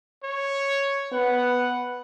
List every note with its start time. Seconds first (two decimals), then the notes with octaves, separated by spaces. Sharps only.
0.23 C#5
1.12 B3 F#5